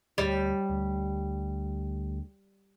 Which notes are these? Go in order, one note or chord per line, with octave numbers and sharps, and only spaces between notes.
D2 G3
D2